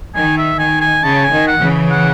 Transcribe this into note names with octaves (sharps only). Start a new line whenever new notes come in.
D#3 G#5
E5
D#3 G#5
G#5
C#3 A5
G#5
D#3
F#5
C#3 E3
F#5